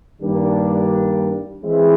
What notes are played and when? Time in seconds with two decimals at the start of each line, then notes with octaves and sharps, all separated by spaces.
0.22 G2 D#3 G3 A#3 D4
1.64 E3 G#3 C4 E4